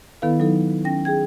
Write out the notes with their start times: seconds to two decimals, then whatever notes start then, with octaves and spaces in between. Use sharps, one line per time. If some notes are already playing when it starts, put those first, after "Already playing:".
0.22 D#3 B3 E4 A4 B4 F5
0.40 F#3 D#4 A4
0.85 C#4 G5 A#6
1.05 G#4 G5 G#6